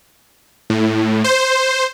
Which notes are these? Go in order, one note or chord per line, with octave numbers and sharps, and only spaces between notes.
A2
C5